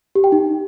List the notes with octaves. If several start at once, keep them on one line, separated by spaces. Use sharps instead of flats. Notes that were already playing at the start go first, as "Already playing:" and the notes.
G4
G5
D#4